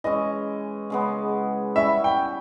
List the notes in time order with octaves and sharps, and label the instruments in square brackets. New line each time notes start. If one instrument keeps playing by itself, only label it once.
[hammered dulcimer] E3 G#3 C#4 [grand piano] D#5
[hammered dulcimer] C#3 G#3 B3
[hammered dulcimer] G3 C#4 E4 [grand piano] E5
[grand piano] G5